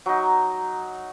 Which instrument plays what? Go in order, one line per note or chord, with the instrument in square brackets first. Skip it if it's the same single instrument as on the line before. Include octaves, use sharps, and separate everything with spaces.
[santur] F#3 D#4